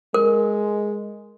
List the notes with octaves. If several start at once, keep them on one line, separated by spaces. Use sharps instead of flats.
G#3 A#4